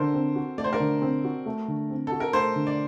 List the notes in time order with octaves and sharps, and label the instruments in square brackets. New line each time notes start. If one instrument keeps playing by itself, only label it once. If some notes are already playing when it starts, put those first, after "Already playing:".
Already playing: [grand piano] D3 [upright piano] A4 A#4 C5
[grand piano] C4
F#4
[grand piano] A3 [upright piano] D5
[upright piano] C5
A#4 D5
[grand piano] D3
C4
F#4
A3
D3
C4
[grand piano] F#4 [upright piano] A4
[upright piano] A#4
[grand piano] A3 [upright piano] A4 C5
[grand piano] D3
[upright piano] D5